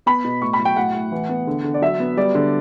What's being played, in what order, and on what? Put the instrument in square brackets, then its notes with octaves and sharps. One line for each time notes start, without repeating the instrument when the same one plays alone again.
[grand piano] B3 B5
B2
A2 C#6
B5
F#3
G5
A2 F#5
A2
E3
B3
D3
D3
D5
F#3 E5
B3
G3 D5
D3